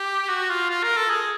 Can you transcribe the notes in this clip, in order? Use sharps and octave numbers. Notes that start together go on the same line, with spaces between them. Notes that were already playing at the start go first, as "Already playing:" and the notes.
Already playing: G4
F#4
F4
F4
A#4
A4
G#4